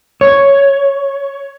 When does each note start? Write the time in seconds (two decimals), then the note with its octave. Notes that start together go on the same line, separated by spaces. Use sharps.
0.21 C#5